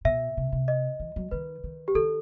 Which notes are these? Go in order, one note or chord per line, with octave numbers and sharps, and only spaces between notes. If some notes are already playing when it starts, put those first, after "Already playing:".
B2 E5
C3
C3
D#5
E3
F#3
D#3 B4
D#3
G4
D#3 A4